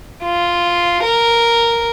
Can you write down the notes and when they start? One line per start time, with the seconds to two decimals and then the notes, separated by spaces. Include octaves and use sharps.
0.24 F4
1.03 A#4